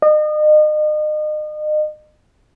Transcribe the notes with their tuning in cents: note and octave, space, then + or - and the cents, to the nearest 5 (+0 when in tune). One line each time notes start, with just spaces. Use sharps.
D#5 -35